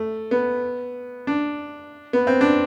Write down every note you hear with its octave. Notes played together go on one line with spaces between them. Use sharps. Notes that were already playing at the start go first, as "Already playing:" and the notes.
Already playing: A3
B3
D4
B3
C4
D4